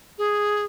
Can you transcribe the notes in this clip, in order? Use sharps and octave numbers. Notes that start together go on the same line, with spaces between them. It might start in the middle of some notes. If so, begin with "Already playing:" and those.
G#4